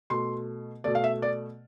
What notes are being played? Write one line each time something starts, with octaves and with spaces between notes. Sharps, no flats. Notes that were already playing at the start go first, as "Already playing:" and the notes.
B2 A3 C6
B2 A3 D5
F5
E5
D5